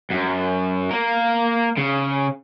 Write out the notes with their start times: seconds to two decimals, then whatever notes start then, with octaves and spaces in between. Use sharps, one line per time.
0.11 F#2
0.91 A#3 A#4
1.77 C#3